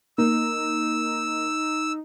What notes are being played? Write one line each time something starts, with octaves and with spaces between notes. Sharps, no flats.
A#3 D#4 E6